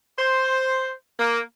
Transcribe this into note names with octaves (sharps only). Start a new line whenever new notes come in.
C5
A#3